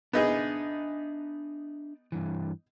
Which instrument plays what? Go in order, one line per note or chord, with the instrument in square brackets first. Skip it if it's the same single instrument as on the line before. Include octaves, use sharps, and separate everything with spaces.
[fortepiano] B3 D#4 G#4 [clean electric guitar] D4 E5 G#5
[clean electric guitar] G2 E3